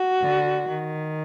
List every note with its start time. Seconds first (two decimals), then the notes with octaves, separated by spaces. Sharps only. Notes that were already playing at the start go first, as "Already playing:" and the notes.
Already playing: F#4
0.21 D3
0.68 D#3